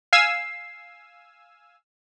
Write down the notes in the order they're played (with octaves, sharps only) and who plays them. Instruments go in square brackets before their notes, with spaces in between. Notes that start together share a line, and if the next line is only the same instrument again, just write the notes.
[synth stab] F5 G#5 E6 [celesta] C7